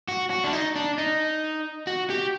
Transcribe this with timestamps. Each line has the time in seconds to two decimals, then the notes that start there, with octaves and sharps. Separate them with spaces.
0.08 F#4
0.30 F#4
0.44 D4
0.53 D#4
0.76 D4
0.98 D#4
1.87 F#4
2.10 G4